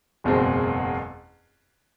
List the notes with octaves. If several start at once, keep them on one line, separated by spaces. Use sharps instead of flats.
F#1 E2 B2 G#3 C4